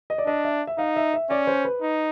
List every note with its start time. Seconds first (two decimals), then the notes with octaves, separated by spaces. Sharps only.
0.10 D#5
0.18 D5
0.26 D4 D#5
0.44 E5
0.67 E5
0.78 D#4 F5
0.96 E5
1.14 E5
1.30 C#4 D5
1.47 C5
1.65 B4
1.82 D#4